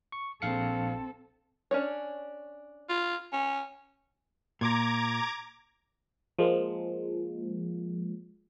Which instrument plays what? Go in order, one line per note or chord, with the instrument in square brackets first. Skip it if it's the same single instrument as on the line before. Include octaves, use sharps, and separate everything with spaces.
[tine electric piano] C#6
[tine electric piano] A#1 F5 C#7 [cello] C4 A4
[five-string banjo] C#4 D4 C#5
[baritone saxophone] F4
C#4
[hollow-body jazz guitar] A#2 [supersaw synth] A#5 D6 G#6
[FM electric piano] F3 G#3 A#3